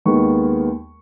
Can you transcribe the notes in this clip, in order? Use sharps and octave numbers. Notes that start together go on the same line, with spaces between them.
D#2 D#3 G#3 B3 C#6